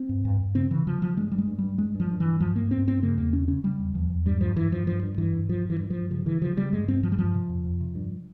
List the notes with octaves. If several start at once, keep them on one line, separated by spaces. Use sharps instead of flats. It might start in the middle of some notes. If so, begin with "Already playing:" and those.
Already playing: C4
G2
G2
G2
C#3 C4
C#3 E3
C#3 F3
C#3 F3
G2 G#3
G2 G3
G#3
G2
G2 G3
G2 G#3
G2
F3
G2
E3
G2
G2 F3
G2 A#3
G2 C4
G2 C4
C#3 A#3
E2 A#3
C#3 C#4
C#3 C#4
C#3 G3
E2
E2 F3
E2
G2 G3
G2 F3
G2 E3
G2 F3
G2 F3
G2
G2 E3
G2
G2 F3
G2 E3
G2
F3
G2
C#3 F3
C#3 E3
C#3 F3
C#3 G3
G2 G#3
G2 C4
G2 F3
G3
G2 F3
C3
F2
F2
C3
G2